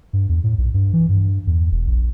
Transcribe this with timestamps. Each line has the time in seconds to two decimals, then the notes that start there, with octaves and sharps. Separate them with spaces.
0.13 G2
0.29 E2
0.44 A2
0.58 B1
0.74 G2
0.93 E3
1.09 G2
1.47 E2
1.72 E1
1.88 A#1